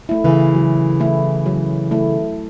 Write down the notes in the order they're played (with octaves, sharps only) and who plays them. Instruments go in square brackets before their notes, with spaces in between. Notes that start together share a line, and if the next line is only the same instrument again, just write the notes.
[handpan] A3 E4
[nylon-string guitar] C#3 E3
[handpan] F#3
A3 E4
F#3
A3 E4